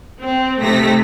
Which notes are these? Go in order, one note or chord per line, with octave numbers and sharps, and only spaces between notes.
C4
C3 A3 D#4 A#6 B6